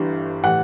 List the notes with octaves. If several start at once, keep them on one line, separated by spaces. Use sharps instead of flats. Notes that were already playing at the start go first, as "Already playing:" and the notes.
Already playing: G1 G2 E3 G3
A2 E3 G3 F#5